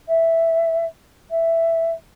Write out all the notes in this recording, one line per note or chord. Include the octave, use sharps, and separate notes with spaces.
E5
E5